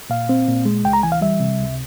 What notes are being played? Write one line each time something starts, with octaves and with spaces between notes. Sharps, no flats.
A#2 F5
C4
A#2
G#3
C#2 G5
A#5
E3 G#5
F5
G3 E5
C3
C#2